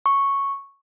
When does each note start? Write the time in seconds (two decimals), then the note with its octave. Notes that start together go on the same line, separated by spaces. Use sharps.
0.06 C#6